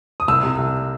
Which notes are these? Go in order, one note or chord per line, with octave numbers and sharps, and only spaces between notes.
D#6
C2 E6
C3
C2